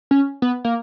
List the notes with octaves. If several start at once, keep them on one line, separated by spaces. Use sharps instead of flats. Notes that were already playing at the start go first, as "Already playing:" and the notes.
C#4
B3
A#3